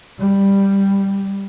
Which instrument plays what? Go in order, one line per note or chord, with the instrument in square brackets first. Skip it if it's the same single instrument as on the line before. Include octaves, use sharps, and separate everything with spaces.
[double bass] G3